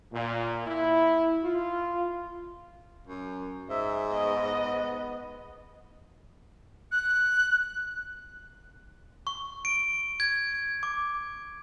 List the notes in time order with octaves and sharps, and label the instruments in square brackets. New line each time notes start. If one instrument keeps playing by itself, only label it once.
[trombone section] A#2
E4
F4
[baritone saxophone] F#2
[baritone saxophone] G#2 [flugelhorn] E5
[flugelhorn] B3 [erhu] D#5
[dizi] F#6
[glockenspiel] C#6
D7
G#6
D6